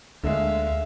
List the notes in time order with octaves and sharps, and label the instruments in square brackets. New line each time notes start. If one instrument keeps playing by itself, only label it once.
[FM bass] D2 [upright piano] D3 G#3 A3 [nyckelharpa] E5 F5